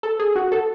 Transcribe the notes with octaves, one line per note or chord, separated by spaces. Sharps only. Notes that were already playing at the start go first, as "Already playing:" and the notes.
A4
G#4
F#4
A4